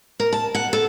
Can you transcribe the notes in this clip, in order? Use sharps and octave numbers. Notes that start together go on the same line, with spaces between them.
A#4
A5
F#5
A4